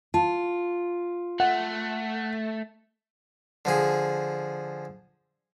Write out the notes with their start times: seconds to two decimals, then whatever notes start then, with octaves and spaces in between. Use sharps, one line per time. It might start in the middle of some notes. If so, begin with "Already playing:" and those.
0.14 F4 A5
1.40 A3 F#5
3.65 D3 F3 G#4